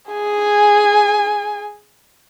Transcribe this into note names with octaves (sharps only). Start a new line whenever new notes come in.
G#4 G#5